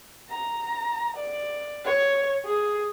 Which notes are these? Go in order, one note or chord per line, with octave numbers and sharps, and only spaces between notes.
A#5
D5
C#5
G#4